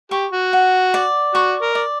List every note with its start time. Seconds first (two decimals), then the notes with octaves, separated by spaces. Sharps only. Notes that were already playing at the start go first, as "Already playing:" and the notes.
0.11 G4 C#6
0.32 F#4
0.53 F#5
0.94 D5
1.34 F#4 C#6
1.62 A#4
1.75 D5